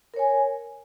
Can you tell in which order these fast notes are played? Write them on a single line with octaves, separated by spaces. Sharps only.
A#4 C#5 G#5